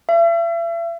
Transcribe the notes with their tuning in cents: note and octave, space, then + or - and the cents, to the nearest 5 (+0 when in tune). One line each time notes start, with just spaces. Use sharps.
E5 +40